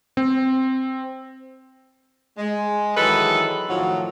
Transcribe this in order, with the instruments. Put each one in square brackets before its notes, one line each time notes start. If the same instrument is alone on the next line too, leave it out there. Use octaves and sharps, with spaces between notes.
[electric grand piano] C4
[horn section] G#3
D#3 E3 F#3 G#3 A4 B4
A2 D#3 F3 F#3